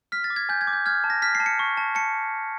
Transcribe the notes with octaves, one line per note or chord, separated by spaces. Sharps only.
F6 B6
A6
D6
G#6
G#5 G6
G#6
D6
G6
F6 G#6
A5
A#6
F6 B6
C7
A5
C#7
C#6
A5
A5 C#7